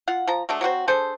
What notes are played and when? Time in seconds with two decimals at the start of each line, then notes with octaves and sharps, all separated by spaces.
0.08 F4 F5 F#5
0.28 F3 A#5
0.49 F#3 G#3 A3 D4
0.61 F#3 C4 F#4 C5
0.88 D4 G#4 A4 C5